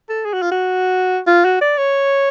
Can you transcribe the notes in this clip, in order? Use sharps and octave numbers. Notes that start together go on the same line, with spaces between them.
A4
G#4
F#4
F4
F#4
F4
F#4
D5
C#5